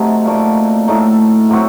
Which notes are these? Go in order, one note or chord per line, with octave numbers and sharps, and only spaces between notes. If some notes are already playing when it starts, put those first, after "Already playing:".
Already playing: C3 F#3 A3 D#4
A#2 A3 D#4
A2 A3 D#4
A2 F#3 C4 F#4